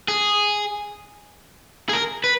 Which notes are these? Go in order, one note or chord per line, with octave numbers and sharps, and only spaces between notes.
G#4
G#4
A#4
B4